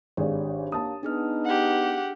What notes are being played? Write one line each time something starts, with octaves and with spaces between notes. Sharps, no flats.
G#1 D4 G4 G#4 C#5 D5
A#3 A5 D#6
B3 D4 D#4 G#4 F6
G4 F#5